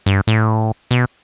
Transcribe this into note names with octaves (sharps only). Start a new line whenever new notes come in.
G2
A2
B2